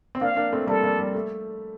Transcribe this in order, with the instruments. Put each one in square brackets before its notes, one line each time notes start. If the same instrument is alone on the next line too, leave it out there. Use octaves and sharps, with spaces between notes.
[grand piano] C4
[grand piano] A#3 D4 [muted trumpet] F5
[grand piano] A#3 D4
A3 C4
[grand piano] G3 A#3 [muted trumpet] A4
[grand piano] G3 A#3
G3
A3